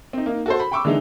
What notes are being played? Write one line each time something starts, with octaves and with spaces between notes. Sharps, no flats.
C4 D#4
A#3 D#4
F#4 A4 C5
B5
G5 B5 C#6 D6 E6
D3 E3 G#3 D4 D#4